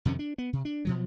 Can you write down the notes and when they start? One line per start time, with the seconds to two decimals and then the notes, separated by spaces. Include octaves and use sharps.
0.05 F2 C3 D#3 C#4
0.19 D4
0.38 B3
0.53 C3
0.65 D4
0.85 B2 F3 F#3